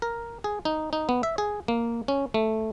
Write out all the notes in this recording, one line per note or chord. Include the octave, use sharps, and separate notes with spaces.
A#4
G#4
D#4
D#4
B3
E5
G#4
A#3
C#4
A3